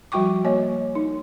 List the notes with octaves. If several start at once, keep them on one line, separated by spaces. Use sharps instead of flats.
F3 G3 F#4 G5 C#6 D6
A#3 C#5 D#5
D#4